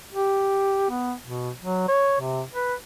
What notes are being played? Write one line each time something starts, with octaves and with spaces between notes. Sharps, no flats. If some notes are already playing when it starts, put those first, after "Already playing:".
G4
B3
B2
F#3
C#5
C3
B4